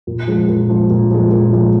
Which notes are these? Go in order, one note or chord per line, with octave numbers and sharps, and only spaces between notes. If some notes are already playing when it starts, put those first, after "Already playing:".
A#2
F3 G#3
A#2
F3 G#3
A#2
F3 G#3
A#2
F3 G#3